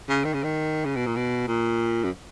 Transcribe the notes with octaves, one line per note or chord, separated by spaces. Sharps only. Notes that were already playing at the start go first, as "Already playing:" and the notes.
C#3
D#3
C#3
D#3
C#3
B2
A#2
B2
A#2
F#2